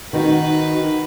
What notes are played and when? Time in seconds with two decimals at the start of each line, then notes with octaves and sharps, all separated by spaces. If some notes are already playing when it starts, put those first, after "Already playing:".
0.13 D#3 D#4 F#4 B4